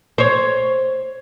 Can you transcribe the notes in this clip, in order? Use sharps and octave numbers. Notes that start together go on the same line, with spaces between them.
C5 C#5